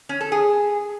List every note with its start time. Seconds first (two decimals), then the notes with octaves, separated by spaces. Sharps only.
0.09 C#4
0.21 A4
0.32 G#4